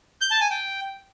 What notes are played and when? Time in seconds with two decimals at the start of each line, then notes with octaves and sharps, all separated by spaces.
0.21 G6
0.31 A5
0.41 G#5
0.51 G5